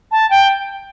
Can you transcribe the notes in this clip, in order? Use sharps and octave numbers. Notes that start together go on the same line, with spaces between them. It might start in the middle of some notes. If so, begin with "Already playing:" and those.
A5
G5